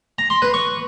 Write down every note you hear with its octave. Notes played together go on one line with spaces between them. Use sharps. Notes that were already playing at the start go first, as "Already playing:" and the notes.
A#5
C6
B4
C#6